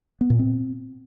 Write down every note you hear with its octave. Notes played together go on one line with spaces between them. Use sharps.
B3
A#2
C4